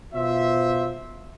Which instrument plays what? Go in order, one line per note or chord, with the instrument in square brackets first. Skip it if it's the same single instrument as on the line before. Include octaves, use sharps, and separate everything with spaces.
[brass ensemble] B2 F4 C5 E5